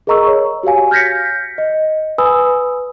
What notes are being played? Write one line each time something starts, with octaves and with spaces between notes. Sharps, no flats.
G#4 A#4 D#5 A#5 C#6 E6
C#5
F#4 G4 C#5 F5 G#5
F6 G6 G#6 A#6 B6 C#7
D#5
B4 G#5 B5 D#6 E6